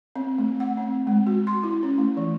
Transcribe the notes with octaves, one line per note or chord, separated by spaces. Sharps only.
C4
A3
F#5
C4
G#3
F#4
C6
E4
C#4
A3
E3